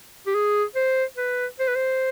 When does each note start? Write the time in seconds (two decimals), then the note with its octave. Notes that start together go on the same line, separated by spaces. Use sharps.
0.26 G4
0.35 G#4
0.75 C5
1.17 B4
1.59 C5
1.68 B4
1.76 C5